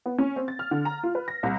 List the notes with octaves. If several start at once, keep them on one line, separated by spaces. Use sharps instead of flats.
B3
C#4
C4
A6
F6
D3
A#5
F4
B4
A#6
C2